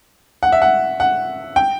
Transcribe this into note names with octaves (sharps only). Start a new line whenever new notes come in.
F#5
E5
F#5
F#5
G5